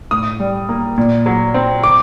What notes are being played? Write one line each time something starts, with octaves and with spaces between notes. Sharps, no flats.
A2 D#6
G3
A#3
A#2
F#3
C4
D6